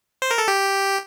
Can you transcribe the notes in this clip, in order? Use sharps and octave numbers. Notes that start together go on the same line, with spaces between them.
C5
A#4
A4
G4